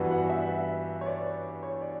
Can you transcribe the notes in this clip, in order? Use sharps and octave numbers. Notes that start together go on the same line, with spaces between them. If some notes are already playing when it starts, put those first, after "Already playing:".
Already playing: G2 E3 B3 D4 F#4
F#5
E5
E5
C#5
D5
C#5
D5